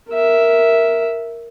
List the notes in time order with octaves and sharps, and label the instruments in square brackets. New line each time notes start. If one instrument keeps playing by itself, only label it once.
[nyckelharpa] A#4 E5